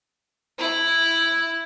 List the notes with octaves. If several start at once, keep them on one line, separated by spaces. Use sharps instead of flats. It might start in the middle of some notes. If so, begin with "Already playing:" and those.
E4